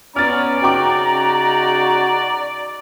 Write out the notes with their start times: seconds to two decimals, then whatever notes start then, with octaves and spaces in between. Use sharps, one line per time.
0.16 B3 C#4 D5 A#5 F6 A6
0.63 C#3 D#4 F#4 G5 D6